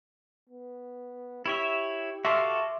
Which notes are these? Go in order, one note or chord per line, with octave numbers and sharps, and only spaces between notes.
B3
E4 G4 C#5 E5
F#4 A4 E5 F5 C6 D6